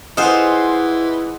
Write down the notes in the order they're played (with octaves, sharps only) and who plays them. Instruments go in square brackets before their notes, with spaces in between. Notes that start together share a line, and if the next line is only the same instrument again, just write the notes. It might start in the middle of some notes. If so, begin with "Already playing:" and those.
[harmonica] E3 [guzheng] F4 G#4 C5 [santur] D#5 F#5